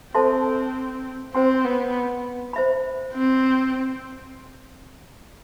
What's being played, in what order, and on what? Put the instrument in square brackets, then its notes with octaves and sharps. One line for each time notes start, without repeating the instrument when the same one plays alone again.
[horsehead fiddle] C4 [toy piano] A4 C5 E5 A5 C6
[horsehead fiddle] C4 [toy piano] C5 G5 C6
[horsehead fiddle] B3
[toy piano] C5 E5 B5
[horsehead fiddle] C4